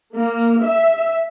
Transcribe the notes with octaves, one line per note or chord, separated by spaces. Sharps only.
A#3
E5